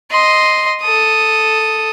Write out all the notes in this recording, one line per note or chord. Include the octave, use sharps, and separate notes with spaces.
D#5 C6
A4 D#6